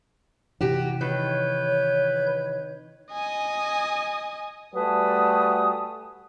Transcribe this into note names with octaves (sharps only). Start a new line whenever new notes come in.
C3 E3 F#4 G4
D#3 B4 C#5 G6
D#5 G#5
G3 A3 F#4 B4 G#5 A5 D#6